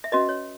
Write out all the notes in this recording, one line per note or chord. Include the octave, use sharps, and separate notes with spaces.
E5
C#4 F#4 B4 D#5
C#5